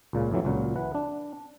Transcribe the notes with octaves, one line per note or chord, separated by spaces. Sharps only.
C#2 A#2 C#3
F2 A2 E3 F#3
C#2 A#2 F#3
E3 B4 F#5
D4